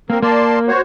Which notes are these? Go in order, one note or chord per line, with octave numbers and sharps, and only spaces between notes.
A#3 C4 A#4
A#3 D5 A5 C6
F#4 C5 C#5